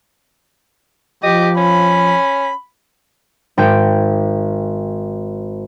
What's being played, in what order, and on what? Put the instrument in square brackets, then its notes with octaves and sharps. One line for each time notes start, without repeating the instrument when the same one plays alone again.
[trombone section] F3 [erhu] G4 [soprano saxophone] D#5
[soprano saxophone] C#4 [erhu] B5
[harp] G#1 G5 D7